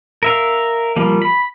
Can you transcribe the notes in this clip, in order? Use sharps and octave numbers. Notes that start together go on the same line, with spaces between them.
A#4 E5 F5
F3 G3 A#3
B5